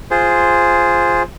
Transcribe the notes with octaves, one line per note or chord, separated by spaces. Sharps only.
F4 G#4 C5